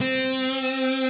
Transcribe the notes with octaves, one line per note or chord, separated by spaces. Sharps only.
C4